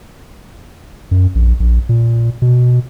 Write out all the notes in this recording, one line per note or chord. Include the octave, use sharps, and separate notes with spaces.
F#2
A#1
A#1
A#2
B2